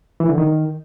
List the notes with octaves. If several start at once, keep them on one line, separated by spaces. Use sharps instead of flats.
E3
D3
D#3